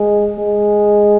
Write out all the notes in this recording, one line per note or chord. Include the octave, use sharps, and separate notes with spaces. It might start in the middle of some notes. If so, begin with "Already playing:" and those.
Already playing: G#3
G#3